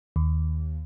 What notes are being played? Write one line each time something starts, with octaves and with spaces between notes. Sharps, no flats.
D#2